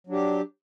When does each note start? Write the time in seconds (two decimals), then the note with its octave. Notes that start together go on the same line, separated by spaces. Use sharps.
0.07 F#3
0.10 D4
0.12 G4